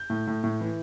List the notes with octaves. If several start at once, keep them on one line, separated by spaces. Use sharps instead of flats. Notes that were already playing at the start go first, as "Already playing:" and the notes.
Already playing: G6
A2
A2
A2
E3